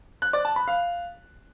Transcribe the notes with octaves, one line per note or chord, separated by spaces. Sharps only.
F#6
D5
A5
B5
F5